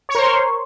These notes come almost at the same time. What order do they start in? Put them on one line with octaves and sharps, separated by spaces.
C#5 C#6 A#4 C5 C6